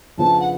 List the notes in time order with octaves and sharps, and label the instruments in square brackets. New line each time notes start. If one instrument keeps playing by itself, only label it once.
[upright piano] F2 C#3 F3 B3 D4 [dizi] A5
[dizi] F#5